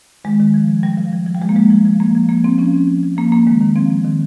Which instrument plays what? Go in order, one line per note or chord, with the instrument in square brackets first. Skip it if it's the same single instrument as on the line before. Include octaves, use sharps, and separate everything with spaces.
[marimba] D#3 G#3
D#3
F3
F3
F3 G3
F3
F3
F3
G3
F3 G#3
A#3
F3 G#3
F3
F3
F3 A#3
F3
F3 A#3
F3 C4
F3 C#4
F3
F3
F3
F3 A#3
F3 A#3
D#3 G#3
D#3
F3 C4
F3
D#3